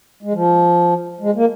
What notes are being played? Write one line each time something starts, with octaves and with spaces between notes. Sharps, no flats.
G#3
F3
G#3
A#3